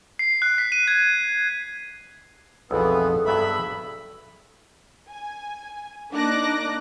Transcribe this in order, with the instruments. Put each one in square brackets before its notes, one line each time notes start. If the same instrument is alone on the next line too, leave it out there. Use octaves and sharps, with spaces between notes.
[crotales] C7
F#6
B6
D#7
G#6
[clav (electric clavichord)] B1 F2 F3 [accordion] E3 B3 [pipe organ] G#4 A4
[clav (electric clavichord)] G2 F#3 B3 [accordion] E5 B5
[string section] G#5
A#3 D4 D#4 D6 F#6 A#6